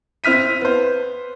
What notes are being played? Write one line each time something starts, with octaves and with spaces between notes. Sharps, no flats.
C4 E4 F6 B6 D#7
B3 C5